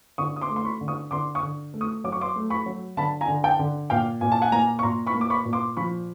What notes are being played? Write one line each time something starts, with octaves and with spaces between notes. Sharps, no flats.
D3 C#6 D#6
D#6
C6 D6
A3
C6
B5 C#6
D3
C#6 D#6
D3 C6 D6
C#6 D#6
D3
A3
C#6 D#6
F#3 D6
C#6
C6 D6
A3
B5 C#6
F#3
D3 A5 B5
G#5 A#5
D3
G5 A5
D3
A#2 F5 G5
A#2 G#5
A5
F#5 G#5
A#3 G#5 A#5
C#6
A#2 A#5 C6
B5 C#6
A#3
D6
B5 C#6
A#2
C6 D6
F3 B5 C#6